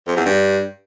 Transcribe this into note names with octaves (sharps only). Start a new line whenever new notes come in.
F2
E2
G2